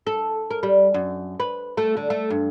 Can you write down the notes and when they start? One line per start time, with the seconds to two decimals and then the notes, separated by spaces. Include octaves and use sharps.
0.07 A4
0.51 A#4
0.63 G3
0.94 F#2
1.40 B4
1.77 A3
1.97 D3
2.10 A3
2.30 G2